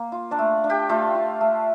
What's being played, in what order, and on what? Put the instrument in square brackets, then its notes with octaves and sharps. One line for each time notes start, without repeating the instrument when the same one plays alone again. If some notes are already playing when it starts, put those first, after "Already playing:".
Already playing: [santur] A#3
F4
D4 D5
A3
D4
G4 G5
A3 F4 F5
F4
A3